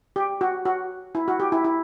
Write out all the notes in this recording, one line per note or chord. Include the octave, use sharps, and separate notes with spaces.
G4
F#4
F#4
E4
F#4
G4
E4
E4